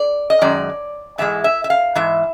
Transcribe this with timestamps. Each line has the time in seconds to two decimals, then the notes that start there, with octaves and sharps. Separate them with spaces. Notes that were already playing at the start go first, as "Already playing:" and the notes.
Already playing: D5
0.30 D#5
0.41 F#2 D#3 G#3 D5
1.18 G#2 E3 G#3 E5
1.44 E5
1.64 E5
1.70 F5
1.95 G#2 E3 E5